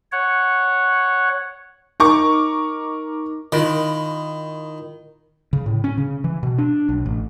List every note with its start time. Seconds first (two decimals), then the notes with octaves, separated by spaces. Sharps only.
0.12 C#5 F#5
2.00 D#4 A#4 C#6 D6
3.52 D#3 E4 F4 B5
5.53 C#3
5.66 A2
5.84 C#4
5.98 C#3
6.24 E3
6.43 B2
6.58 D4
6.89 B1
7.06 A1